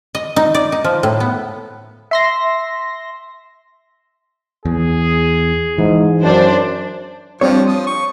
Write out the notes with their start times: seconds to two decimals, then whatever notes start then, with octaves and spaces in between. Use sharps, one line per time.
0.15 D#5
0.36 D#4
0.55 D5
0.72 D#4
0.84 F3
1.03 A2
1.20 B3
2.11 E5 C6 A#6
4.65 E2 G#4
5.78 G#2 E3
6.22 F#2 D4 C5
7.41 F3 G3 C4 D4 C#5
7.67 F3 D#6
7.87 C#6